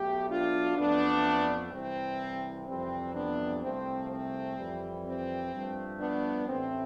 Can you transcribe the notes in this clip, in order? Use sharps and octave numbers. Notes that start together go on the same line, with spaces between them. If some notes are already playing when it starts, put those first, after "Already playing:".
Already playing: B1 B2 A3 G4
D4 F4
F2 E3 A3 B3 D4
C2 C3 E3 C4
F2 C3 E3 G3 C4
B3 D4
C2 C3 F3 A3 C4
C4
F2 E3 G3
C4
G2 F3 A3
B3 D4
A1 A2 E3 A3 C4